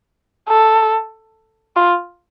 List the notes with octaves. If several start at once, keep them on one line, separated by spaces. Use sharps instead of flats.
A4
F4